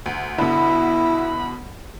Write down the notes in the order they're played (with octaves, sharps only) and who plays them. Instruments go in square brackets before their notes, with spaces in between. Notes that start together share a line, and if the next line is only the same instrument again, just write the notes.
[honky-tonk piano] D2
[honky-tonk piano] B2 D3 [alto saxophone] E4 [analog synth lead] B5